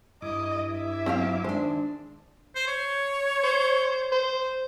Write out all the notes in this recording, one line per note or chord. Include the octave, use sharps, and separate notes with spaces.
G2 E4 D#5 D6
E5
F#3 C4 F4 D#5 F5
D#3 G#3 D4 C5
C5
C#5
C5
C5